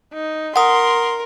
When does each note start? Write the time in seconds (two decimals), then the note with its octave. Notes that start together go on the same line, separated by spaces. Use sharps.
0.14 D#4
0.56 A#4 F#5 C6 D#6